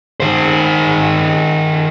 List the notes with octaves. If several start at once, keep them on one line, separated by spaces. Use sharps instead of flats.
D#3 C5